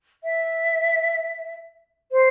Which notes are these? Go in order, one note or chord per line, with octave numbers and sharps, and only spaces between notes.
E5
C5